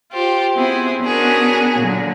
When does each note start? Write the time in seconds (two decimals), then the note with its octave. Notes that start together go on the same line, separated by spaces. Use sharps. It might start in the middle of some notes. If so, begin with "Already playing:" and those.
0.12 F4 G4 C5
0.56 B3 C4 E4 G#4
1.01 B3 C#4 D4 F#4 G#4 A#4
1.79 A#2 D3 F#3